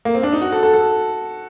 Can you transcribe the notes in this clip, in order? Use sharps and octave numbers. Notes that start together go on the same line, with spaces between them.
A#3
C4
D4
D#4
F#4
A4
A4
A4